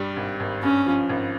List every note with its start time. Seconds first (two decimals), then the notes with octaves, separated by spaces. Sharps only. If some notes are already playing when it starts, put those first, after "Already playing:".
Already playing: G2 G3
0.17 G#1
0.40 G#1
0.63 G2 C#4
0.86 F3
1.09 G#1